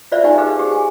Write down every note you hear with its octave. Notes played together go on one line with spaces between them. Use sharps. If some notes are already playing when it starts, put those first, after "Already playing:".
F4 B4 C5 D5 E5 F5
D#4 G4 G#5 A#5
D#4 G4 G#4 B4 C5 F5
G4 G#4
G#5